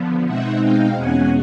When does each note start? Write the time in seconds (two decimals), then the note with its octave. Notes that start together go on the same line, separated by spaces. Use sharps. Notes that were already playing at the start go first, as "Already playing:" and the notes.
Already playing: D3 F3 B3
0.25 B2 G#3 C4 D#4 E5 F#5
0.62 F5 G5
0.96 E2 B2 G#3 C#4 F#5 G#5